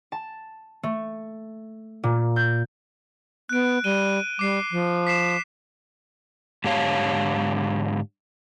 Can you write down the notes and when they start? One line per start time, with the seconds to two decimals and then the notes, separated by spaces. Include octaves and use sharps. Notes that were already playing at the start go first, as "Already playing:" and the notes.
0.12 A5
0.83 A3
2.03 A#2
2.36 G6
3.49 B3 F#6 D7
3.84 G3 D#7 G7
4.39 G3 D6 C7
4.71 F3
5.07 B6 C7 E7
6.64 G#2 D3 G4 C#5 F5 A5